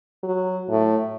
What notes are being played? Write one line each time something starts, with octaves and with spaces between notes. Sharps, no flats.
F#3
A2